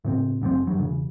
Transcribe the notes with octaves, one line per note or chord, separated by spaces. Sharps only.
A2 C#3 C4
F#1 F#2 A#2 C4
G2 F#3
E1 C#3